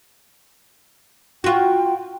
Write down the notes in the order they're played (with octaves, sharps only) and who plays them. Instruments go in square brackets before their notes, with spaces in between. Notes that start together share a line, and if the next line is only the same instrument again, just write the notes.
[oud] F4 F#4 [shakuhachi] G5